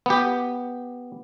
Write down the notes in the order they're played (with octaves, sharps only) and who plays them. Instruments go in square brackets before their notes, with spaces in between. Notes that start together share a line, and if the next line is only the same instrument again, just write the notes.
[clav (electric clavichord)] B3 G4